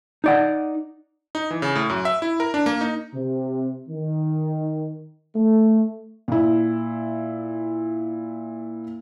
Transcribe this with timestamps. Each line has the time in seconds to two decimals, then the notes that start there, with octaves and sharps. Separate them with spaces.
0.24 D#4 D5 F#5
1.35 D#4
1.51 E3
1.62 C#3
1.75 A2
1.90 F#2
2.05 E5
2.22 E4
2.40 A#4
2.54 D4
2.66 A#3
2.81 D#4
3.14 C3
3.89 D#3
5.35 A3
6.28 A#2 E4